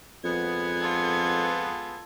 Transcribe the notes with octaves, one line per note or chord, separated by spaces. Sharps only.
F2 G#3 B3 G#6
F4 A4